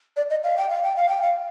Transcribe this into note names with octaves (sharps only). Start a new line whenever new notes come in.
D5
D#5
F5
G5
F5
G5
F5
G5
F5